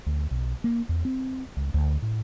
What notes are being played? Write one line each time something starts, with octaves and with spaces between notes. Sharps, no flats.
D2
B1
A#3
E2
C4
C#2
D2
A2